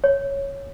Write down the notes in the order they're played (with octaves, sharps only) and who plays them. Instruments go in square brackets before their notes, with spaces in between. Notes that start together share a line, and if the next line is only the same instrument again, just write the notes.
[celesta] C#5